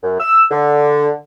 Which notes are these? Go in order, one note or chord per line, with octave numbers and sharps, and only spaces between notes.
F#2
E6
D3